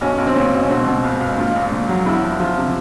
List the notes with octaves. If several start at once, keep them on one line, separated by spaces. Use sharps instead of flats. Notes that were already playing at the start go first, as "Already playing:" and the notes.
B1 C#4
B1
C4
A#2 C#4
B1
C#4
B2 C4
B2
C#2
C#2
A#2 F4
A#1
A#2
F#3
E2 E4
F3
F3 F4
C3